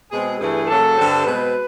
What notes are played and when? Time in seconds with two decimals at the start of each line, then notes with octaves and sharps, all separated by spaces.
0.10 B2 G#3 C4 G#4
0.38 G2 E3 A3 G#4
0.67 C#3 F#3 A#3 A4
0.95 G2 D3 G3 C4
1.24 B2 G#3 C4 B4